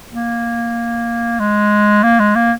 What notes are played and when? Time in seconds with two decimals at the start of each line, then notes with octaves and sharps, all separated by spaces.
0.12 A#3
1.40 G#3
2.03 A#3
2.20 G#3
2.36 A#3